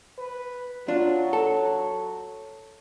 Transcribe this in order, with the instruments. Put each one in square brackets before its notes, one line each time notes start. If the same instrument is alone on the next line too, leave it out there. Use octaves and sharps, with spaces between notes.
[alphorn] B4
[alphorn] F#3 [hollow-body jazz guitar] D4 F4
[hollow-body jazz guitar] A4